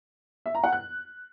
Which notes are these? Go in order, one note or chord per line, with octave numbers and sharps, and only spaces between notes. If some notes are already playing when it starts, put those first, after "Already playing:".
E5
A#5
F#5
F#6